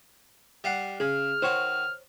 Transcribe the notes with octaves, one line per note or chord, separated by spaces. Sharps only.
G3 F5 F#5
C#3 G#4 F6
D#3 F#4 C5 C#5